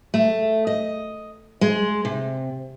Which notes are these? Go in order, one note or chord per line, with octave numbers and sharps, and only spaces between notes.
A3
D#5
G#3
C3